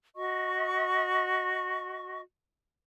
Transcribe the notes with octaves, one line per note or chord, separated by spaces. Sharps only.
F#4 D#5 C#6